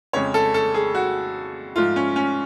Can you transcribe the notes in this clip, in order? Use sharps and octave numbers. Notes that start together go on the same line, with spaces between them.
F2 C#3 G#3 C#5
A4
A4
G#4
F#4
G#2 F3 A3 F4
C#4
C#4